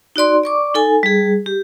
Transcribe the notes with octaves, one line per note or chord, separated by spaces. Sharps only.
D#4 F#4 D5 C6
D5 C#6 D6
D#4 A4 G#5
G3 G#4
G4